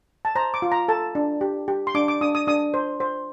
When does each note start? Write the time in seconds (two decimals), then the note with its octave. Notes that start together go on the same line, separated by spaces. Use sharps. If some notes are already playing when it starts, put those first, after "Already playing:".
0.25 A5
0.35 C5 A#5
0.54 D6
0.62 F4
0.72 A#5
0.88 A4 A5
1.15 D4
1.41 G4
1.68 G4
1.87 C6
1.95 D4 D6
2.08 D6
2.21 D4 D#6
2.35 D#6
2.47 D4 D#6
2.74 C5
3.00 C5